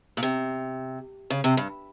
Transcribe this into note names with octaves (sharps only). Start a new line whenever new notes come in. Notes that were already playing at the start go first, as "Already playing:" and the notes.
A#2
C3
C#3
C3
G2